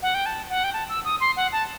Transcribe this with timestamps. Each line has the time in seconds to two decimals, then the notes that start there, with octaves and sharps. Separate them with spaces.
0.02 F#5
0.14 G5
0.26 A5
0.50 F#5
0.64 G5
0.73 A5
0.89 E6
1.05 D#6
1.20 C6
1.36 F#5
1.52 A5